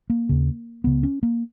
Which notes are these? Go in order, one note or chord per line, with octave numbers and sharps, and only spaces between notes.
A#3
D#2 C#3
C#2 C#3 B3
C#4
A#3